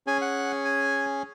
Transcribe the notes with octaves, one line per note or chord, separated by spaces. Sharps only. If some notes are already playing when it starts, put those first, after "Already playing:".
C#4 G#4 G#5
F#5
G#5